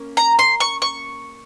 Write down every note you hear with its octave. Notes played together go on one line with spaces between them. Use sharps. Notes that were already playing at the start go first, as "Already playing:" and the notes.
Already playing: A#3 C#4
A#5
C6
C#6
C#6